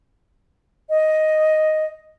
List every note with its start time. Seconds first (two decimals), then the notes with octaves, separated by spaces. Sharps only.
0.90 D#5